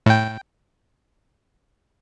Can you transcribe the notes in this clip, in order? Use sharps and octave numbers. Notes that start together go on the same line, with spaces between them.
A2 G5